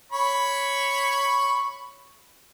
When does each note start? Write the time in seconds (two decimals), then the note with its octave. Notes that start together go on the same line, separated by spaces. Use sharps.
0.12 C#5 B5 C#6